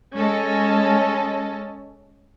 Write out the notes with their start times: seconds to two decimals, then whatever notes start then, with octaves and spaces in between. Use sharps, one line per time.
0.15 G#3 C#4 A4 D#5